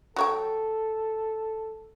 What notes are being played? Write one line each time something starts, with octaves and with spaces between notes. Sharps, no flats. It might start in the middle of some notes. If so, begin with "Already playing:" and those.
F#3 A4 C#5 G5